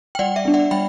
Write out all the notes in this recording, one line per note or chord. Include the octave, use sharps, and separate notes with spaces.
G5
G3 D5 F#5
E5
B3 D4
D5 F#5
G3 G5 B5